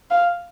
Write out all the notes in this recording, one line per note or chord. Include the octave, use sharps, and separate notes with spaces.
F5